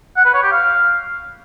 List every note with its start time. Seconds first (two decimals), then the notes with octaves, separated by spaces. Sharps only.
0.16 F#5
0.25 B4
0.34 C#5
0.43 G4
0.52 F5